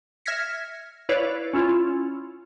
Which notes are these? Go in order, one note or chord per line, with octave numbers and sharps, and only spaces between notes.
E5 F6 G#6 A#6 B6 C#7
E4 B4 C#5 D5 F5
C#4 E4 F4